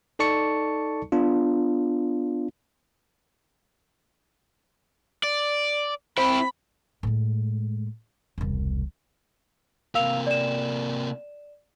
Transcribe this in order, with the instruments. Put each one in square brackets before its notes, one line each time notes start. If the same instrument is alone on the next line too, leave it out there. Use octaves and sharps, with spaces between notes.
[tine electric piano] D#4 A4 D5 A5 C#6 C#7
B3 D4 F4
[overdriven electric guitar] D5
[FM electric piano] C4 [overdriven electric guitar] E4 G5 [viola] B5
[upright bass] A2 G#3
E1 C2
[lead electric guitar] C3 A#3 [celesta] F5 E6 F7
[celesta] D5 E7